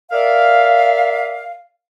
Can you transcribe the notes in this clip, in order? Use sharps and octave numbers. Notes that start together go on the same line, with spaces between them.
A#4 D5 E5 F5